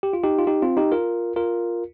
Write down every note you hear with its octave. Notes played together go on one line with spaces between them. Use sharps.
G4
F4
D#4 G4
F4
D#4 G4
C4 F4
D#4 G4
F4 A#4
F4 A#4